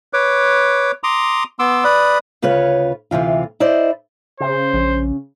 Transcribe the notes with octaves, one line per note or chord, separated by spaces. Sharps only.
B4 C#5 D6
A#5 C6 D6 D#6
B3 C6 D6 E6
B4 D5 B5 D#6
D2 C#3 F4 B4 C#5
D2 C3 E3 F4
E4 C5 D5 D#5
C#3 C5
A#1